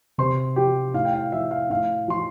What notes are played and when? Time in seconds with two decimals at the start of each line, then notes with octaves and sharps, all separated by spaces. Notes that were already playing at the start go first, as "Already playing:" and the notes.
0.18 C3 C5 C6
0.56 F3 G4 G5
0.94 A2 F5
1.05 G5
1.13 F5
1.32 F3 E5
1.51 F5
1.70 A2 F5
2.08 F3 C6